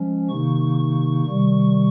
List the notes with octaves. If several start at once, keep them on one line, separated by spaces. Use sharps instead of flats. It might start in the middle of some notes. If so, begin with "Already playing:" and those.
Already playing: F3 G#3 C#4
C3 D#3 A#3 D#4 C#6
C#6
C3 D#3 G3